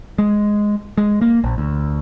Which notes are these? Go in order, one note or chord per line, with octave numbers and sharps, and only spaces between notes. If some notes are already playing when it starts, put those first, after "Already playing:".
G#3
G#3
A#3
A#1
D2